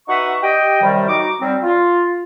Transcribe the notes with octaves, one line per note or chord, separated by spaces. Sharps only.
D#4 F#4 B4 E5 F#5 C#6
G4 D#5 G5
F#2 C3 D#3 F#3 G3
D#4 F#4 D6
F#3 G3 C4
F4